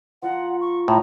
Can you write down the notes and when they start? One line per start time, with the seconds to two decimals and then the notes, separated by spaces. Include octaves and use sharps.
0.22 F3 F4 F#5 A#5
0.61 C#6
0.88 A2 A#5 D#6